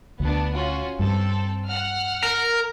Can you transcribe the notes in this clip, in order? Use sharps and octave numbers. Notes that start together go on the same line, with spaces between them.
D2 B3 D4
C#4 F4 F#4
G2 C4 A4
F#5 F6
A#4